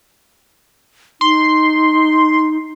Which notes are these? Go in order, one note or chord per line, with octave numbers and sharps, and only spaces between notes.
D#4 C6